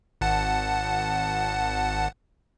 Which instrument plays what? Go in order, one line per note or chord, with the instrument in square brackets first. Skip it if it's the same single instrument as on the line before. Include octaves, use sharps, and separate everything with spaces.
[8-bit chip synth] G#1 F#5 A5